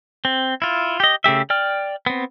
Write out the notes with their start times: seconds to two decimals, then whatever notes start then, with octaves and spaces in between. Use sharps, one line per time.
0.25 C4
0.62 E4 F4
1.00 G4 D#5
1.24 C#3 A3 G4 E5
1.50 D5 G5 F6
2.06 B3 C4